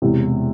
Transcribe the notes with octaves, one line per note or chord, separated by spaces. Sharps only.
E1 E2 C3